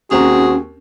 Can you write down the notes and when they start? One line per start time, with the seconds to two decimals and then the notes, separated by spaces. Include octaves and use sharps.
0.11 D#2 C4 C#4 F#4 G#4 A#5